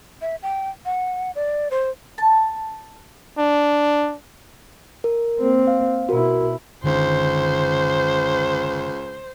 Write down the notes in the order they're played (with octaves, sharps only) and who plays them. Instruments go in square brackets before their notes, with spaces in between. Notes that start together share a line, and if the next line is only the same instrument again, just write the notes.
[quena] E5
G5
F#5
D5
C5
[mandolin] A5
[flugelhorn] D4
[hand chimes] A#4
[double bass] A#3 C4
[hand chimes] F5
[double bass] B2 E4 [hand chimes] F#4 A#4
[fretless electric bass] F#1 D3 D#3 [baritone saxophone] C#2 [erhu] C5